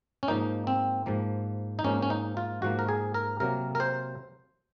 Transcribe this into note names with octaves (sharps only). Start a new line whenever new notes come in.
C#4
G#2 F3 A#3 D#4
C4
G#2 F3 A#3
D#4
G#2 F3 A#3 C#4
C#4
D#4
F4
G#2 F3 A#3 F#4
A#4
G#4
A#4
C3 F#3 A#3 A#4
A#4
C5